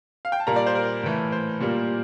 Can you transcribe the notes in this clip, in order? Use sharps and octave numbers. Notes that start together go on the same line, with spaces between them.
F5
G5
A5
A#2 G3 A#3 A#5
D5
C5
A#4
A2 E3 A3
C5
A#2 G3 A#3